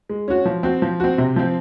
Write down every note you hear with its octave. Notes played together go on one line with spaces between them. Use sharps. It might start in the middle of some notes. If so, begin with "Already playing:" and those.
G#3
C#4 F#4
F3
C4 F#4
F3
C4 F#4
C3
F3 C4